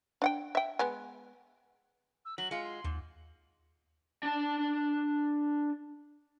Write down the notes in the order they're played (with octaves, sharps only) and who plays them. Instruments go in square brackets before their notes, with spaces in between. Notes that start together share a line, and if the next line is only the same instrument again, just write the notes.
[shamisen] D4 F#5 G5
E5 G5
G#3 B3 G#5
[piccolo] E6
[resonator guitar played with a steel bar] F#3 [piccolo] F#7
[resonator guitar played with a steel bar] G#3 F4 [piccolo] C#7
[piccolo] C6
[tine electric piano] D#2 [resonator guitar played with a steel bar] G#2
[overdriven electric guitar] D4 A5